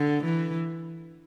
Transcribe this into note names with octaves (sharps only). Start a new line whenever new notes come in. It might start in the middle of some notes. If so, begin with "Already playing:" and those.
Already playing: D3
E3